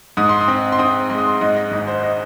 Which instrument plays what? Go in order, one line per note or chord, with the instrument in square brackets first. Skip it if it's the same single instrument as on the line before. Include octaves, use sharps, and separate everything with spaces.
[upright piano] G#2 D#6
C6
D#6
C4
C6
C4 D#6
G#3 C6
D#6
C6
G#2 D#5
D#5
G#1 D#5
C5
D#5